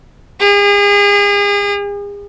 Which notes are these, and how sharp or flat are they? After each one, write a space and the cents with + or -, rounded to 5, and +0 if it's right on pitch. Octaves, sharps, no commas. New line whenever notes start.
G#4 -40